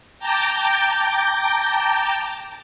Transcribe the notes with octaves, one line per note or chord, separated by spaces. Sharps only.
G5 A5 A#5 D6 G6